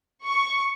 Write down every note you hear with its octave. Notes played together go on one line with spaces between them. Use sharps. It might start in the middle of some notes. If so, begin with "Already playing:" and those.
C#6